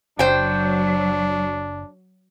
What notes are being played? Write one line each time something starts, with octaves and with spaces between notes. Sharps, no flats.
F#1 F#3 D4 C5 G5